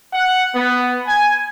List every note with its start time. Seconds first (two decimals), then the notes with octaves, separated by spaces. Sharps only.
0.13 F#5
0.55 B3
1.07 G#5